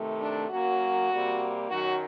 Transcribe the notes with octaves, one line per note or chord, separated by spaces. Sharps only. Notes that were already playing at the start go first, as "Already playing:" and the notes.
Already playing: C3 D#3 A3
D4
F#2 F#3 A#3 F#4
C3 G3 A#3
F#2 D#3 F#3 F#4